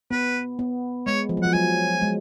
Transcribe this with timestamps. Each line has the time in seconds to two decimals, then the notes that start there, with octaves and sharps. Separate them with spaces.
0.11 B3 B4
0.59 B3
1.07 G#3 C#5
1.29 F3
1.37 F#3
1.43 F3 F#5
1.53 F#3 G#5
2.02 G#3